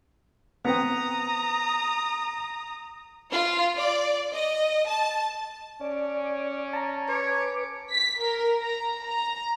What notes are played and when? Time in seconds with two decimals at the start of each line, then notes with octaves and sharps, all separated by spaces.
0.65 B3 C4 G5 A#5 D#6
3.31 F4
3.77 D5
4.33 D#5
4.88 A5
5.81 C#4 D5
6.73 A5 A#5
7.08 B4 C#5 D6
7.92 B6
8.22 A#4
8.59 A#5
9.06 A#5